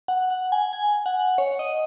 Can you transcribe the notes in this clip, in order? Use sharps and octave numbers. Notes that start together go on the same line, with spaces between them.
F#5
F#5
G#5
G#5
F#5
C#5
D#5